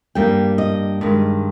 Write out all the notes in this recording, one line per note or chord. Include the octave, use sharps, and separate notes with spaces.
G2 G3 A#3 G5
D#5
G2 D#3 G#3